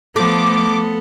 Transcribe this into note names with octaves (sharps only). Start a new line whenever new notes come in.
F3 A3 B3 A4 D6